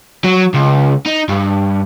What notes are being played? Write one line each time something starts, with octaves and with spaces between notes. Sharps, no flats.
F#3
C#2
D#4
G2